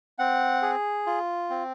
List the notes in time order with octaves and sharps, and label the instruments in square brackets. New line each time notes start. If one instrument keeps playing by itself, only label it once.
[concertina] C4 F#5
G#4
F4
C4